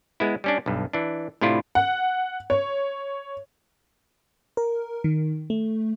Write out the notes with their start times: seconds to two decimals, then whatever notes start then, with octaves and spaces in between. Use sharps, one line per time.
0.20 G#3 B3 E4
0.44 G3 C#4 D4
0.66 B1 G2
0.93 E3 D4
1.41 A2 C3 D4 E4 F4
1.75 F#5
2.50 C#5
4.57 A#4
5.04 D#3
5.50 A3